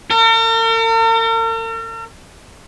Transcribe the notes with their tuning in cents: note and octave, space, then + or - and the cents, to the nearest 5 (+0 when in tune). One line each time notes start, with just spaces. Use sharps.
A#4 -45